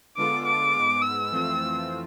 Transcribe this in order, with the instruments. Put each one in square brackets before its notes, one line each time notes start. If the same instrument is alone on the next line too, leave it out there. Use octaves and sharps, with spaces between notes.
[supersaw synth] D3 G#3 B3 F4 A4 [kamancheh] D6
[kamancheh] D6
[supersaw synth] G#2 G#3 B3
[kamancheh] E6
[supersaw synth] F2 E3 A3 C4 F4